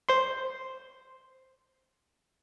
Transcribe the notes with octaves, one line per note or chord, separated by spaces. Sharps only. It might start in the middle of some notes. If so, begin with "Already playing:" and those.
C5 C6